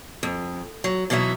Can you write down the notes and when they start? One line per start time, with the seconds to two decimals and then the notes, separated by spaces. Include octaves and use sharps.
0.23 F2
0.84 F#3
1.10 B2 E3 F#3 D#4 E5